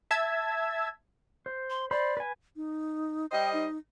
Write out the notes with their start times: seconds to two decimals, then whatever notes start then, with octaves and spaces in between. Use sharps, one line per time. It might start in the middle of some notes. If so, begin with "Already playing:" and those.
0.11 E5 A5 E6 G#6
1.46 C5
1.70 C6
1.91 C5 D5 B5
2.17 B4 G#5
2.56 D#4
3.32 G3 C5 D#5 G5
3.54 D#4